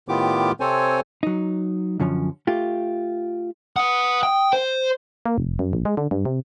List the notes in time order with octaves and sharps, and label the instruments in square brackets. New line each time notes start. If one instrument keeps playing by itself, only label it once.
[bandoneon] A2 D#3 B3 F4 G4 D6
C3 C4 A4 C5 C#5 G#5
[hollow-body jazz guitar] F#3 D#4
F#2 D3 F3 C#4
A3 F4 G4
[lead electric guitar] B4 F#5 [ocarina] D#6
[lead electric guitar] G5
C5
[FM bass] A#3
F1
F#2
A#1
G#3
D3
G2
C3